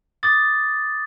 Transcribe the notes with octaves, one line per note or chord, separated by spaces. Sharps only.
D6 D#6 A6